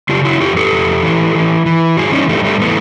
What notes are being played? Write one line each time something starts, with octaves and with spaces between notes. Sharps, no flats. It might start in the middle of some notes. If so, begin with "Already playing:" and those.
C#3 F4 G4
E4 F#4
F2 F4 G4
G4 A4
F2
E3
E3
E3
G2 F#4 G#4
C#4 D#4
G2 G3 A3
G3 A3
E3 A3 B3